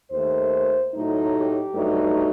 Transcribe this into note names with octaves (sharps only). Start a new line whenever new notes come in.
D#2 D#3 A3 C5
A2 F#3 A3 D#4
G4
G2 F#3 A3 D#4